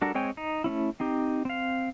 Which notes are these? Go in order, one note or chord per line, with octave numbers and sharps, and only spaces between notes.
G3 D4 F#4 A4 A#4
G#3 C4 C#5 G5 G#5
D#4
A3 B3 C#4 E4
C4 D#4 G4
C4 F5